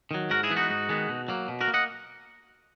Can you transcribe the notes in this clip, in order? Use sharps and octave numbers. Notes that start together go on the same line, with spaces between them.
D#3 F#3
G#2 F#4 A#4
E4 G#4
E3 G#3 B3
D#4 F#4
G#2
D#3 G#3 B3
B2
F#3 A#3
B2
F#4 A#4
A#3
D#5 F#5